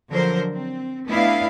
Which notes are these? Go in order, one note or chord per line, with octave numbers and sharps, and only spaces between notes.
D3 F3 F#3 A#4 C5
C4
A3 B3 D4 E4 D#5 F5